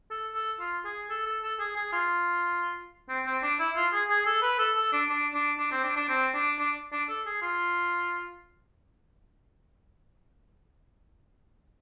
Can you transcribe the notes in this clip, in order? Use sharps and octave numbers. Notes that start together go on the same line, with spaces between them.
A4
A4
F4
G#4
A4
A4
A4
G#4
G#4
F4
C4
C4
D4
E4
F4
G#4
G#4
A4
B4
A4
A4
D4
D4
D4
D4
C4
D4
D4
C4
D4
D4
D4
A4
G#4
F4